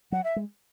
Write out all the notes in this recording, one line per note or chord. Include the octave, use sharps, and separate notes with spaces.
F#3 F#5
E5
G#3